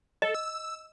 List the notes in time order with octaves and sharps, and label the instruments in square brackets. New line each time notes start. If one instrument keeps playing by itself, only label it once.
[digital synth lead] A4 [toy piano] D#5
[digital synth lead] E6